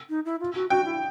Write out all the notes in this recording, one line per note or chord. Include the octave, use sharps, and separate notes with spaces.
D#4
E4
F4
F#4
F#4 G5
E4